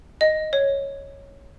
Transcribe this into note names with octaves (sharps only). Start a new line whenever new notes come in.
D#5
C#5